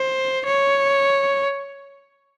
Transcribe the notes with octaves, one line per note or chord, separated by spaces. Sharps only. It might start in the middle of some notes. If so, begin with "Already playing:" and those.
Already playing: C5
C#5